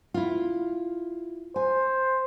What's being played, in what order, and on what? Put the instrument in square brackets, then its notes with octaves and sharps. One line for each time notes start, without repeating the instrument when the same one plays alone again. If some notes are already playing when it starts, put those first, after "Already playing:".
[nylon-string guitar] E4 F4
[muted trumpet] C5 [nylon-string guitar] G#5